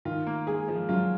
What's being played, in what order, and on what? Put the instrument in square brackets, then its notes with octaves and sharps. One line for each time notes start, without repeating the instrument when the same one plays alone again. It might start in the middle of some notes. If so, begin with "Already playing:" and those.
[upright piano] D#3 [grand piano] F4
[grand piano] A#3
[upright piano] G#3 [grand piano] G#4
[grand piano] F3 [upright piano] G#3
[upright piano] F#3 [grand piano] F4